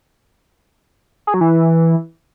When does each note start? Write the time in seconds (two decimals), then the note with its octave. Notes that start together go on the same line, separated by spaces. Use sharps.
1.27 G#4
1.34 F#3
1.41 E3